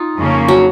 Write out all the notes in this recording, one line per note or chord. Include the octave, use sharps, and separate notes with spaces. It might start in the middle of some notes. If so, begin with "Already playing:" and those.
Already playing: D#4 F4
F2 C#3 F3 A#3 C#4
F#3